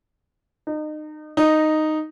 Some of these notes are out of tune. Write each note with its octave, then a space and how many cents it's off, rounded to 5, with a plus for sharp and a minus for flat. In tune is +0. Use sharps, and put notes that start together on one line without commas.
D#4 -30
D#4 -5